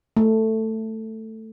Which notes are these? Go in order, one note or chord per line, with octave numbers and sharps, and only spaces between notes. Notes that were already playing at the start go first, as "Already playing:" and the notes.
A3